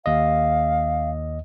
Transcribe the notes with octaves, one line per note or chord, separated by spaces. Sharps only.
D#2 D#5 F5